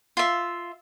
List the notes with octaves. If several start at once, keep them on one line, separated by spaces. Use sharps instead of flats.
F4 E5